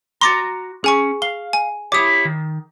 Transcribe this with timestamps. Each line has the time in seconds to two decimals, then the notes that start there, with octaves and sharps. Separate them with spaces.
0.21 F#4 A#5 C6 D6 A6
0.84 C#4 G#4 G#5 C#6
1.22 F5 G7
1.53 G#5
1.92 E4 G4 C#5 D6 D#6
2.25 D#3